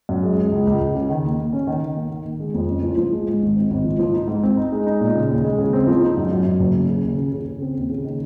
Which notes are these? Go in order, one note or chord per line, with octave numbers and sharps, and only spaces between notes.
F#2
G#3
G#3
C#2
C#2
C#2
C#3
D#3
D#2
D#2
C#4
D#3
D#3
A#3
D#3
D#3
G#3
F2
C#4
F3
F3
G#3
G#2
G#1
C4
G#1
F3
F3
D#4
G#2
C4
D#4
G#3
D#4
A#2
C#3
D#2
G#3
C#3
C4
F3
D#4
F#2
F#2
F#2
F#1
F#2
C#3
D#2
C#3
C#3
C#3
C4
D#2
C#3
D#3